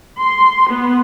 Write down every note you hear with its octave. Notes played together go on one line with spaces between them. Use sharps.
C6
B3